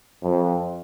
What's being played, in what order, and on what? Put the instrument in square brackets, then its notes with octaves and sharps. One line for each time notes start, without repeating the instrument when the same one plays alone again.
[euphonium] F2